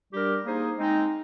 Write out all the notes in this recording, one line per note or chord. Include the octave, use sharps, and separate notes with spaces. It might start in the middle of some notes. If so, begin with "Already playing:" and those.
G3 D4 G4 A#4
A#3 D#4 G#4 C5
G#3 C4 D#4